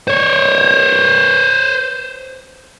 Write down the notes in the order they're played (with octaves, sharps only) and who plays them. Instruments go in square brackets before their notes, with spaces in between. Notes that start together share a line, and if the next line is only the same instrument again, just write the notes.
[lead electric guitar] C5 C#5